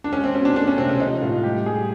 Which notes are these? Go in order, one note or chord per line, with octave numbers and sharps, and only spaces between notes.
D4
G#3 C#4
C4
B2 C#4
D4
A3 D4
C#4
C3 C4
C#4
F3 D#4
A2 F4
G3 G4
G3 G#4